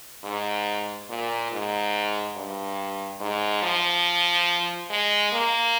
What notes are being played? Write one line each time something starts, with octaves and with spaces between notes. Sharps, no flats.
G#2
A#2
G#2
G2
G#2
F3
G#3
A#3